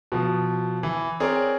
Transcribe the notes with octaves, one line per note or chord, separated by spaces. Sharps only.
B2 F3
E3
C4 G#4 A#4 C#5 D5